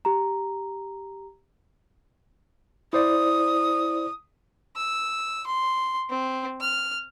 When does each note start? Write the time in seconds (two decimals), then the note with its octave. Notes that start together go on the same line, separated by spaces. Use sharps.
0.05 G4 A#5
2.93 E4 C5 D5 D#6
4.76 E6
5.46 C6
6.10 C4
6.60 F6